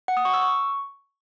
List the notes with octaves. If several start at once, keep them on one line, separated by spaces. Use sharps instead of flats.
F#5
D#6
C#6
E6
C#6